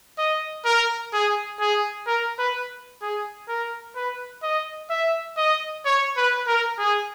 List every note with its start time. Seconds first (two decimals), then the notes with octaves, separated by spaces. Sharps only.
0.18 D#5
0.65 A#4
1.13 G#4
1.60 G#4
2.07 A#4
2.39 B4
3.02 G#4
3.48 A#4
3.96 B4
4.43 D#5
4.90 E5
5.37 D#5
5.85 C#5
6.17 B4
6.47 A#4
6.79 G#4